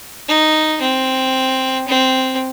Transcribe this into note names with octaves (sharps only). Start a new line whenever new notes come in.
D#4
C4
C4